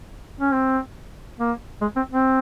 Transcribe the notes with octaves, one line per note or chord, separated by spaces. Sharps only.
C#4
C4
A#3
G#3
C4
C4